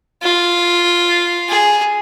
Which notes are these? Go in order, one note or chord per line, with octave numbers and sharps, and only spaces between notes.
F4
G#4